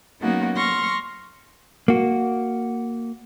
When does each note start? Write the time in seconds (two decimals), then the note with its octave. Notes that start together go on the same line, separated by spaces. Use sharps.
0.20 F#3 A#3 B3 C#4 D#4 F#4
0.55 C6 C#6 F6 A#6
1.88 A#3 F#4